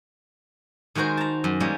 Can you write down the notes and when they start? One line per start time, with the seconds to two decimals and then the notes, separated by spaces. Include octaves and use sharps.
0.95 D#3 G#3 F#4 A#4 C5
1.17 A5 A#5
1.44 F#2
1.60 G3 G#3 A#3 C#4